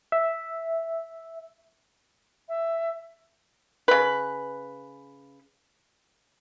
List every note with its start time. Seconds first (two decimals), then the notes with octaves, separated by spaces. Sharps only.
0.12 E5
2.49 E5
3.88 C#3 B4